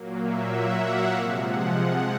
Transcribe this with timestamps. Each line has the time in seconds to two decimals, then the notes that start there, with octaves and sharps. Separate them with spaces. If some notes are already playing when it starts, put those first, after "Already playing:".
Already playing: A#2 F#3 A#3
0.23 E5
0.52 F#5
0.82 F5
1.13 C3 F3 G#3
1.43 F#5
1.73 F#5